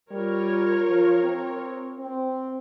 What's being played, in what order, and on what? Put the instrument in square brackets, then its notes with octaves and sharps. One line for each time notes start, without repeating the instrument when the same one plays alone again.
[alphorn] G3 [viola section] F4 A#4 C#5
[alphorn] F3
C4
C4